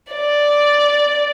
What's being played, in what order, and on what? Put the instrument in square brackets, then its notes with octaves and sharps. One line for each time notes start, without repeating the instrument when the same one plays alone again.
[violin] D5